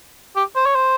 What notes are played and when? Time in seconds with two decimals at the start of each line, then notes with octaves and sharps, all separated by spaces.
0.36 G4
0.56 C5
0.66 C#5
0.75 C5